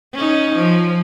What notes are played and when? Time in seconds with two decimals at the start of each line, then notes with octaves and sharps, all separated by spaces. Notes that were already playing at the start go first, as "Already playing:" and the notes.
0.14 C#4 D#4
0.56 F3